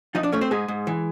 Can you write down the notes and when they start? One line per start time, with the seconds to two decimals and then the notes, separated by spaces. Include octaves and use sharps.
0.15 F3 D#4 D#5
0.23 D4 D5
0.32 A3 C#4 C#5
0.41 C4 C5
0.51 G#2 G#3 G#4
0.68 G#2
0.87 E3